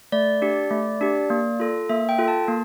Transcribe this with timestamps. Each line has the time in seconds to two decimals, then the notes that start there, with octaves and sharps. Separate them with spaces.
0.12 A3 D5
0.42 D4 G4
0.71 A3
1.01 D4 G4
1.30 A#3
1.60 F4 A4
1.89 A#3 E5
2.09 G5
2.18 F4 A4
2.28 A5
2.48 A#3